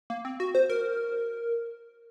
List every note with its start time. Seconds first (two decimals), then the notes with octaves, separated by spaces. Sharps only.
0.10 A#3
0.25 C4
0.40 F#4
0.55 C5
0.70 A#4